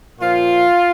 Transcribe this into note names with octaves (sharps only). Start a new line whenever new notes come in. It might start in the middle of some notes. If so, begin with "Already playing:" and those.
A#2 F3 F4